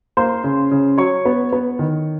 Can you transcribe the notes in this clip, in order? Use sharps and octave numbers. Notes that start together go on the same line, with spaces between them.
A#3 C5 C6
C#3
C#3
F#3 C#5 C#6
B3
B3
D#3